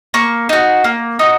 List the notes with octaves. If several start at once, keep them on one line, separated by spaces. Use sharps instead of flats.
A#3 C#6
D#4 F#4
A#3
D#4 F#4